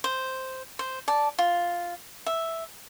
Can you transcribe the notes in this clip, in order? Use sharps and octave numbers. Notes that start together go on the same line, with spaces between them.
C5
C5
D5 A5
F4
E5